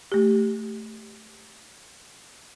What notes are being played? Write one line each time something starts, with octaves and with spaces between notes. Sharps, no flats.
A3 G4